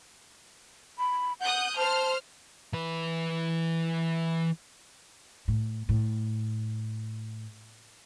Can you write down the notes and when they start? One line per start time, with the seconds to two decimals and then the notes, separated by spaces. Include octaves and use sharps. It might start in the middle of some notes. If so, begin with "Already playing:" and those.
0.98 B5
1.40 F#5 D#6 F#6 G6
1.76 C5 A5 F6
2.73 E3 B4
5.48 A2
5.89 A2